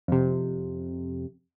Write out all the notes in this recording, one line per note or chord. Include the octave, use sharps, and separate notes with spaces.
F2 C3